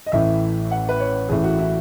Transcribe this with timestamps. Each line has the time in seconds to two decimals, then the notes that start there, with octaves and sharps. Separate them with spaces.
0.06 D#5
0.12 A1 A2 E3 E5
0.71 F#5
0.89 B4
1.00 C#5
1.29 A1 A2 E3 G#4
1.44 F#4
1.59 E4